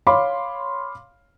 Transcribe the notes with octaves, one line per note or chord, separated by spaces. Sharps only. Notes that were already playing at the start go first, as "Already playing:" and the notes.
C#5 F5 B5 C6 D6